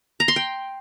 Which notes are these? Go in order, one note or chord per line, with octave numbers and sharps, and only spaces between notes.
A#5
C6
G5